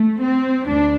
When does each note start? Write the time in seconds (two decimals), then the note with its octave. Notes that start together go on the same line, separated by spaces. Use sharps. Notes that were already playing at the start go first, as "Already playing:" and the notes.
Already playing: A3
0.23 C4
0.67 D2 D4